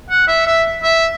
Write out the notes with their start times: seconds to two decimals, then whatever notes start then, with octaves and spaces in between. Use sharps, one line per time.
0.10 F#5
0.28 E5
0.46 E5
0.83 E5